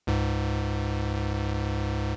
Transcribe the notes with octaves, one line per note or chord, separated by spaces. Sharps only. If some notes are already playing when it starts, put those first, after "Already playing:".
C#2 G#2